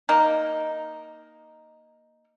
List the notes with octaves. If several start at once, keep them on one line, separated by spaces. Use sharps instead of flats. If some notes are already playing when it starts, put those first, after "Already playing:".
A#3 D#4